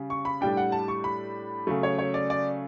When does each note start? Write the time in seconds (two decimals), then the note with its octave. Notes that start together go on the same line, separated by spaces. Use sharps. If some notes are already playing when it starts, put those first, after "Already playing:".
Already playing: C#3 G3
0.10 C#6
0.25 B5
0.41 A2 G3 D4 G5
0.57 F#5
0.72 A5
0.88 C#6
1.04 B5
1.67 C#3 F#3 A3
1.83 C#5
1.99 C#5
2.14 D5
2.30 D5